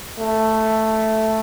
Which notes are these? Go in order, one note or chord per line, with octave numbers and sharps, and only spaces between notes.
A3